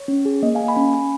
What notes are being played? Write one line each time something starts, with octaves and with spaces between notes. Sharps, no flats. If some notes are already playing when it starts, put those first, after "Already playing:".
Already playing: C#5
C#4
G#4
A#3 D#5
F5 G#5
A#3
G#5 B5
C#4
C#4 G#5 B5